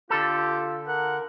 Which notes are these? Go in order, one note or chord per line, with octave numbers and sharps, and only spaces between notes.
D3 F4 G4 A4
A#4 F#5